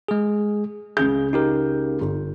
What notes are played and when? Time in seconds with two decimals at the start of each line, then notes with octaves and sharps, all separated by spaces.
0.08 G#3 G#4
0.97 C#2 C#3 G#4 G6
1.33 D#4 G4 A#4
2.01 G1